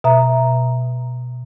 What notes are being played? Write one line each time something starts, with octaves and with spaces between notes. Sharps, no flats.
B2 E5 A#5